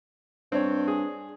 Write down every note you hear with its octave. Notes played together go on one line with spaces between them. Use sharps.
G2 C4 C#5
G#4